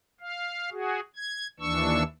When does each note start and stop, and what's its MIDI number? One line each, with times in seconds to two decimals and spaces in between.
0.21 0.70 77
0.72 1.00 66
0.72 1.00 68
1.16 1.48 92
1.60 2.03 39
1.60 2.03 52
1.60 2.03 62
1.60 2.03 85
1.60 2.03 88